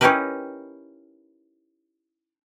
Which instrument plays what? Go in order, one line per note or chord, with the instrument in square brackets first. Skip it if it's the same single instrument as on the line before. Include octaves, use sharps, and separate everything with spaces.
[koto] C#4 D#4 E4 G4 A#4 B4